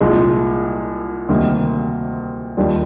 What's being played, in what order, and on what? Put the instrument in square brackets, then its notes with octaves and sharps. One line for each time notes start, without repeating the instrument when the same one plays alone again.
[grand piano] C2 A#2 G#3 D#4
D2 C3 D#3 G3 A#3
D#2 D#3 G3 D4 F4